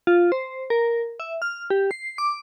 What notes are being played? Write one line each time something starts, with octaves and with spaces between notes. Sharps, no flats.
F4
C5
A#4
E5
F6
G4
C7
D6